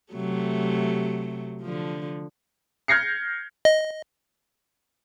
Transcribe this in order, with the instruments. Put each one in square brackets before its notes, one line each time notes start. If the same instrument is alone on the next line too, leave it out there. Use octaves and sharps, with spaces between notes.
[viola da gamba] C3 F#3 A3
D3 F3
[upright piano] F6 G6 G#6 A#6 C7 C#7
[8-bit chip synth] D#5